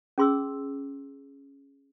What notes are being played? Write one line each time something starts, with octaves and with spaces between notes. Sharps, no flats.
C#4 G#4 C6 D6 E6